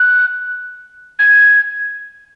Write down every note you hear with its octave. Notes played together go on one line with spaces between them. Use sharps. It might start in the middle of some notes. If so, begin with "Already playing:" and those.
Already playing: F#6
G#6